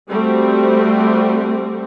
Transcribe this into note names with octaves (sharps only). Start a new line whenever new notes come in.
G3 A3 C4 F#4